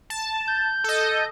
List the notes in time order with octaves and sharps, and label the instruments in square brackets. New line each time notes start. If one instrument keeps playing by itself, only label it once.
[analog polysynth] A5
[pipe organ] G6
[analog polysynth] A4 D#5